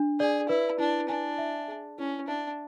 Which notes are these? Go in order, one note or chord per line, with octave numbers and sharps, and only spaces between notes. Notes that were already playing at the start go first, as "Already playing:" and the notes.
Already playing: D4
G#4 D5
E4 B4
D4 E4
D4 G#5
E5
G#4
C#4 E4
D4 E5